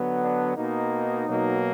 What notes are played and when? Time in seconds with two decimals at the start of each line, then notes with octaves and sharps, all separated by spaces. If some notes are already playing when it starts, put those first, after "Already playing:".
Already playing: D3 F#3 B3
0.20 D4
0.55 B2 A#3 D#4
1.27 B2 F#3 A#3